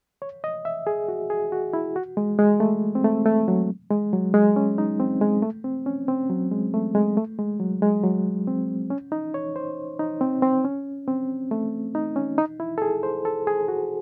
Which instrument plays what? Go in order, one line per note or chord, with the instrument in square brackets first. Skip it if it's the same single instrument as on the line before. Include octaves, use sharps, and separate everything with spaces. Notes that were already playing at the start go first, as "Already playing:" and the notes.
[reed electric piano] C#5
D#5
E5
G#4
F#4
G#4
F#4
E4
F#4
G#3
G#3
A3
C4
A3
A3
F#3
G#3
F#3
G#3
C#4
D#4
C4
G#3
A3
C4
C#4
C4
F#3
G#3
A3
G#3
A3
G#3
F#3
G#3
F#3
C4
C#4
D#4
C#5
C5
D#4
C4
C4
C#4
C4
A3
D#4
C#4
D#4
E4
A4
G#4
C5
A4
G#4
F#4